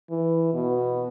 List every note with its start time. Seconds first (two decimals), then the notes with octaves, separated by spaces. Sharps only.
0.10 E3
0.54 B2